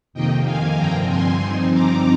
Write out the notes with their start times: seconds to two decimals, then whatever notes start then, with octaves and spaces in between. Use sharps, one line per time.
0.13 F2 C3 D#3 A#3 D#5 G5
0.45 F5 G#5
0.77 G2 D3 F3 C4 G5 A#5
1.10 G#5 C6
1.41 G2 F3 C4 D#4
1.73 A#5 D6